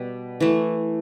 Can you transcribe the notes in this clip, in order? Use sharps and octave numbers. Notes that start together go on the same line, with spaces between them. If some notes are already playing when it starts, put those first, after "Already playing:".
Already playing: B2 G3
E3 A3